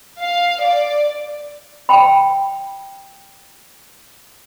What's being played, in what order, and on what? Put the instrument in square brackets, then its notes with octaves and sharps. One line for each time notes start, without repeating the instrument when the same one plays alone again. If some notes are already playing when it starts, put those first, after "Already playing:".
[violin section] F5
D5
[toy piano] G5 B5